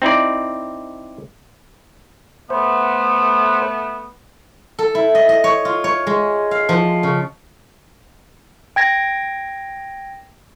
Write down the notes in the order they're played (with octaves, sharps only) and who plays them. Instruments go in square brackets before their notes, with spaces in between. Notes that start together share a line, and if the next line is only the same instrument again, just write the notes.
[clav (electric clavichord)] C4 D#4 E4 D5
[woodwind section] A3 B3 [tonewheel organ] C5
[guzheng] A4
E4
D#5
D#5
C#5
F4
C#5
G#3
F5
F3
C#3
[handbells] G5 G#6 A#6